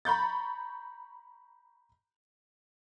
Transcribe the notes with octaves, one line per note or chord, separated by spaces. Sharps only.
A#5 B5 C#6 G6 A6